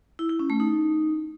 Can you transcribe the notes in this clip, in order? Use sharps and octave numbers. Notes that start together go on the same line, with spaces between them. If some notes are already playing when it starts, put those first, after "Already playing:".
E4
E4
C#4
A3
D#4